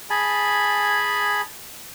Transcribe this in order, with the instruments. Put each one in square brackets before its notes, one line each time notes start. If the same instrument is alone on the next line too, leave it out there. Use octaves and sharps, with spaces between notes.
[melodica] G#4 G#5 A5 B5